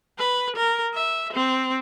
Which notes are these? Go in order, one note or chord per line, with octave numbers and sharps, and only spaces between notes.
B4
A#4
E5
C4